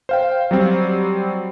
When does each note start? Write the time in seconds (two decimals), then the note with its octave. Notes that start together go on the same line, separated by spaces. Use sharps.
0.09 C5 F5 G5
0.51 F#3 G3 C4